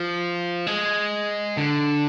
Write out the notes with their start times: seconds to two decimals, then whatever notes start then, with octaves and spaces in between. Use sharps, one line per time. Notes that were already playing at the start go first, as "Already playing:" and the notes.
Already playing: F3
0.67 G#3
1.57 D3